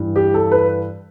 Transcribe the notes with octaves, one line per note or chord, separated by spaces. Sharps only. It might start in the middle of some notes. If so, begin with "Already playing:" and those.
Already playing: G2 E3
G4
A4
B4